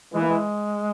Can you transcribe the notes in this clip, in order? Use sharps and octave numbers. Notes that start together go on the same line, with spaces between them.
E3 G#3
A#3
G#3